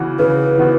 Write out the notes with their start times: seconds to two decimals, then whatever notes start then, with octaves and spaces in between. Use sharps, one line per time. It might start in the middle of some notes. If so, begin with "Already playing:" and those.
Already playing: C#3 E3 B3 F#4
0.19 C#3 B4
0.57 E3 B3 F#4